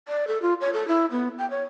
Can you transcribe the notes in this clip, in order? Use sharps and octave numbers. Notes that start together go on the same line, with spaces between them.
D5
A4
F4
C#5
A4
E4
B3
G5
C#5